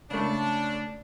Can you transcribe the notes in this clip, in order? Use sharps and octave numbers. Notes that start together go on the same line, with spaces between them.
C#3 A3 D4